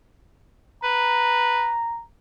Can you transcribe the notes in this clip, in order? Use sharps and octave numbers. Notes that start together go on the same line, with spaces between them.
B4 A#5